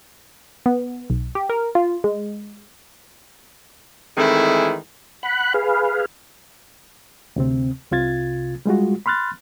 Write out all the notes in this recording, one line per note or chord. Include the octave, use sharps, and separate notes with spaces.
B3
B1
G4
A#4
F4
G#3
D#3 E3 G#3 A3 C4 E4
F#5 B5 F#6
G#4 B4 F5
D2 C3 C4
C2 C3 F4 G#6 A6
G3 G#3 F4 F#4
B5 C6 F6 F#6 A6